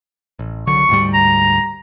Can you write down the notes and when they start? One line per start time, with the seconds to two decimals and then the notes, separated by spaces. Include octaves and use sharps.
0.39 A1
0.67 C2 D3 F#3 C#6
0.89 D2 G#2 G3
1.14 A#5